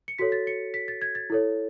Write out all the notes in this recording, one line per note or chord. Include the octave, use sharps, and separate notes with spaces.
C#7
F#4 A4 C#5 B6
A6
C#7
B6
A6
G#6
A6
E4 A4 C#5